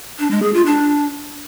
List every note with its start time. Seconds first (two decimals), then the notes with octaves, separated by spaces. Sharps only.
0.19 D4
0.31 G#3
0.42 G#4
0.54 F4
0.66 D4